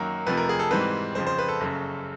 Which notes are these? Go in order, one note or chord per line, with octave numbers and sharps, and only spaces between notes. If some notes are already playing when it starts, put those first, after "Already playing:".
Already playing: F#2 D#3 F#3 A#3 A#4
F2 C3 F3 A3 B4
A#4
G#4
A4
G#2 E3 G3 C4 B4
F2 C#3 F3 C5
C5
B4
A4
F#1 F#2 C#3